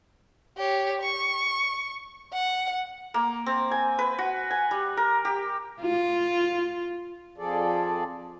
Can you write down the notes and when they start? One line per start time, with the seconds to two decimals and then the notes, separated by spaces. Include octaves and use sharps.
0.57 G4 C#5
1.01 C#6
2.32 F#5
3.14 A#3
3.46 C4
3.71 G#5
3.99 B4
4.18 F#4
4.51 G#5
4.71 G3
4.97 A#4
5.25 G4
5.81 F4
7.38 F2 F3 G#4 A4 D5